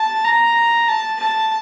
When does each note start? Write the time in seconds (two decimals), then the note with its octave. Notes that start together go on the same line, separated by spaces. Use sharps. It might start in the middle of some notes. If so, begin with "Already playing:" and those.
Already playing: A5
0.25 A#5
0.89 A5
1.20 A5